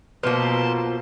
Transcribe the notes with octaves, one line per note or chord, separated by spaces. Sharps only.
B2 F3 A#3 B4 A5 C6